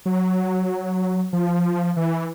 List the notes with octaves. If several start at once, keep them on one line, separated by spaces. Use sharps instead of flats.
F#3
F3
E3